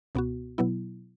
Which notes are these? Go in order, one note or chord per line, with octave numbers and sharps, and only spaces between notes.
C#2 B2 B3 F#4
B2 F#3 B3 E4